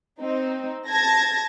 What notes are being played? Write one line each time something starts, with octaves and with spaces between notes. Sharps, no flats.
C4 D#4
A5 G#6 A#6